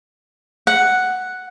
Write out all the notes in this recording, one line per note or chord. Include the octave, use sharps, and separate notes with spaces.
F#5